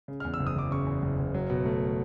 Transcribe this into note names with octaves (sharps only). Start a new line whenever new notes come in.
C#3
E2 F6
E6
F#1
D#6
F#1 D6
C#3 C#6
E2
F#1
F#1
F#3
B2
A3